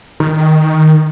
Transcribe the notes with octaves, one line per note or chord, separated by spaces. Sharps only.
D#3